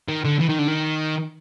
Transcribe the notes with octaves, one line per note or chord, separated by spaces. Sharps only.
D#3
D3
E3
D#3
D3
D#3